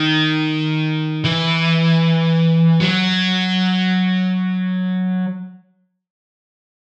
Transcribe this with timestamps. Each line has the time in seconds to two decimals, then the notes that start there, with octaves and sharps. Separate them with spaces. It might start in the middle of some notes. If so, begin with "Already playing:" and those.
Already playing: D#3
1.24 E3
2.80 F#3